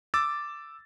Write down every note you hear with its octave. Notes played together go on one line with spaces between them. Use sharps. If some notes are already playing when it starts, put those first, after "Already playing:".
D6 E6 A6